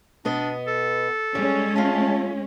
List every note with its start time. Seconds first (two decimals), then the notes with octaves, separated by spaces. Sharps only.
0.25 B2 B3 D4 D#5
0.67 A4
1.35 G3 G#3 C#4
1.76 A3 F4 A5